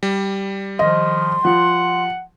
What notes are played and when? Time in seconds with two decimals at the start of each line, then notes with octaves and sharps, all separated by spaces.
0.03 G3
0.79 D#3 F3 D#5 C6
1.45 F3 F#5